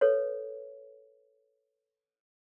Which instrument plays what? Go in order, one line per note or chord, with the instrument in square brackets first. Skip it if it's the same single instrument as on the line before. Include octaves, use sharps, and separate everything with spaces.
[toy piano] A4 B4 C#5